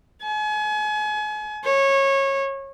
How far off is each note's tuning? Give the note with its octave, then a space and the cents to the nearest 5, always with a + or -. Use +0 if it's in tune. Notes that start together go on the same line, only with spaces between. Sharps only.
G#5 +35
C#5 -20